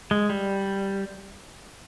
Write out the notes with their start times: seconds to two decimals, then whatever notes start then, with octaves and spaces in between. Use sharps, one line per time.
0.11 G#3
0.30 G3